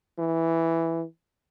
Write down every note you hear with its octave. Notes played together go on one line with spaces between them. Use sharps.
E3